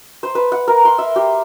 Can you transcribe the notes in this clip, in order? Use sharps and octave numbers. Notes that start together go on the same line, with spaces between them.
C5
B4
F#5
A#4
C6
E5
G4